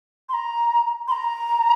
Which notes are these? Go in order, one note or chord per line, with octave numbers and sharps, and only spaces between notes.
C6
A#5
C6
A#5